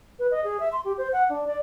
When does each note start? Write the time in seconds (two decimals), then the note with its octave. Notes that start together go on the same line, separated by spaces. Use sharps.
0.19 B4
0.31 D#5
0.44 G#4
0.60 E5
0.73 C6
0.85 G4
0.98 C5
1.13 F#5
1.29 D4
1.47 D5